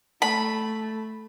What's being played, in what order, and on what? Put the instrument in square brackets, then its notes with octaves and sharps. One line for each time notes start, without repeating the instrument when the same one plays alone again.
[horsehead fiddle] A3 [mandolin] B5